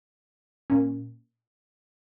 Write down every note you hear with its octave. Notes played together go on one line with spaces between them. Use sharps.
A#2 A#3 C#4